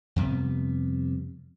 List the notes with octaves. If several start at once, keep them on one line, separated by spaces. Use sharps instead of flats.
F2 C3 G3 B3